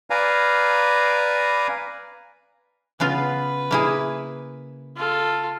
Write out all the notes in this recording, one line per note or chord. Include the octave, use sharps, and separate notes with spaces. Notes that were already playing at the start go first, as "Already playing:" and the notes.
B4 D5 F5 G#5 A#5
C#3 B3 F4 B4
A#3 E4 G#4
F4 A4